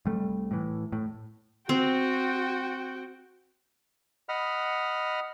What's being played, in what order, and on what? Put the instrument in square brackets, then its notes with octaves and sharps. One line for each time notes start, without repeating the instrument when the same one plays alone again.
[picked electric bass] C2 G3 A3
A2 E3
A2
[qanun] C4 [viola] F#4 G5
[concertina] D#5 F#5 B5 F6